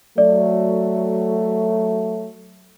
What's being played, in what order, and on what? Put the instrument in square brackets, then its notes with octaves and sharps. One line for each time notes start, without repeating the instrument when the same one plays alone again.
[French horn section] F#3 A3 [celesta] D5